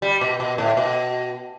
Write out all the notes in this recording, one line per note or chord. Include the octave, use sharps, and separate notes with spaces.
G3
B2
B2
A2
B2